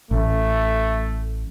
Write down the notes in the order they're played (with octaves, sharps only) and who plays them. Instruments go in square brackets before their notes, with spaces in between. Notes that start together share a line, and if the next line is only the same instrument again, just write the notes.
[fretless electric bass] A1 [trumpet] A3